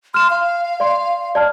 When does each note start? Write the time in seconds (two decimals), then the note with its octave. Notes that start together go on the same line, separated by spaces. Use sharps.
0.14 C6 F6 E7
0.30 F5
0.80 D5 C6
1.35 D5 A5 F6